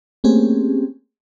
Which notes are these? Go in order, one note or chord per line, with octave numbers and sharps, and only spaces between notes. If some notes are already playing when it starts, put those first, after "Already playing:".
A3 A#3 C4 C#4 G4 G#4